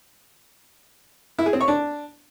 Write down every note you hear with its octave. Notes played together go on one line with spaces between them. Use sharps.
E4
G#4
C4
C#5
D4